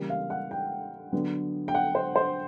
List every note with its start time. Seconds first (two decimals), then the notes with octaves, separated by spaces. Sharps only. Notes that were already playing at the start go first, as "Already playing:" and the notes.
Already playing: C#3 E3 G3 A#3
0.10 F5
0.30 F#5
0.51 G5
1.12 D3 F#3 B3
1.68 G5
1.75 F#5
1.95 C5
2.16 C5